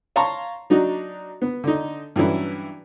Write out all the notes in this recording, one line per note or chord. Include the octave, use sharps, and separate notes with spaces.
C#5 F5 A5 A#5 C6 C#6
F#3 D4 D#4 F#4
B3
D3 D#4
G2 E3 F#3 C#4 E4